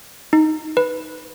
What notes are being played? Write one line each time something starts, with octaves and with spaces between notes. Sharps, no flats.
D#4
B4